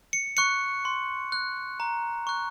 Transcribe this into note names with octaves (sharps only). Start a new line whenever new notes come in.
C#7
C#6 F#6 C#7
C6
F#6
A#5
C#6 F#6